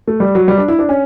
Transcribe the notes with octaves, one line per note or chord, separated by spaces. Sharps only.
A3
G3
F#3
G3
D4
E4
D4
C#4